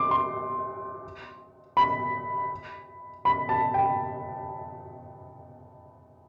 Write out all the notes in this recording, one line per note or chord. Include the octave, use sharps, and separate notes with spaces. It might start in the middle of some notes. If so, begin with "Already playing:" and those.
Already playing: C6 D6
C6
B5
B5
A5
G5